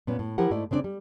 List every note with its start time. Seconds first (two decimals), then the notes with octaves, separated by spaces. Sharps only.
0.07 A#2 B3 C#4
0.19 A2
0.38 F3 E4 G4 A#4 F#5
0.51 G#2 A3 E4 D5
0.71 C#3 C4 D4 D5
0.84 G3